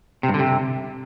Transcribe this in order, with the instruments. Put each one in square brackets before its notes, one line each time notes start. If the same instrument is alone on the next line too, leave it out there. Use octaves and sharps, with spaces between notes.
[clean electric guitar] C3
G2
D3
C3